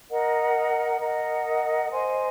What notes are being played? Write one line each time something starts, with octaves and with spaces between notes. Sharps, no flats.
A#4 D#5 F#5
A#4 D#5 F#5
C5 D#5 G#5 C6